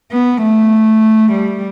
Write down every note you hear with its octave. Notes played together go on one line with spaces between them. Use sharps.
B3
A3
G3